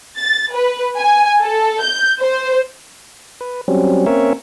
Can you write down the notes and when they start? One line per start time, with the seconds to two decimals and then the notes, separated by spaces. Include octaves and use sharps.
0.19 A6
0.54 B4
0.98 G#5
1.44 A4
1.83 G6
2.20 C5
3.41 B4
3.68 F#3 G3 C4 C#4
4.06 A#3 C4 C#4 A#4 C#5 E5